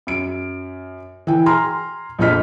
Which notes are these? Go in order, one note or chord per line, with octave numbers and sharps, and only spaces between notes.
F#2 D7
E3 G5
G#5 A#5 C6 F6
A#1 F2 F3 D#5 F6 B6